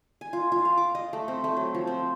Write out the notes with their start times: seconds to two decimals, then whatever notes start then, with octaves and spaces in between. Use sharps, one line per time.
0.21 G#5
0.33 F4
0.52 F4
0.65 F5
0.77 D6
0.95 D#5
1.13 A3
1.28 C4
1.44 A3
1.57 F#3
1.75 F3
1.87 C4